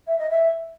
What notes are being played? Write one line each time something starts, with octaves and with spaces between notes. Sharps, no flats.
E5
D#5
E5